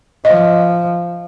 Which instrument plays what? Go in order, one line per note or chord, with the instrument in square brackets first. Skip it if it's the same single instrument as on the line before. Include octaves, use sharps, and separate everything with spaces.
[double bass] F3 [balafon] D#5